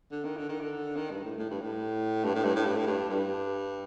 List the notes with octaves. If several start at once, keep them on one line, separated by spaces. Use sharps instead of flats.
D3
D#3
D3
D#3
D3
D#3
G2
A2
A2
G2
A2
G2
A2
G2
A2
G2
A2
G2
G2